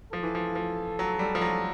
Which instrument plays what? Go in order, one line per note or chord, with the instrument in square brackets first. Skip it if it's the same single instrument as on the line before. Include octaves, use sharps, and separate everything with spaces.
[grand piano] F3 [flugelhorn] A4
[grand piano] E3
F3
F3
F#3
G3
F3
F#3